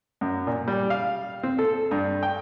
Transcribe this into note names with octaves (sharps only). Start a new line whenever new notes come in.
F#2
A#2
G3
F5
C4
A4
G2
G5